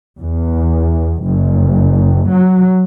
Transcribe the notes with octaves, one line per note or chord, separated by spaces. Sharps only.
E2
F#1
F#3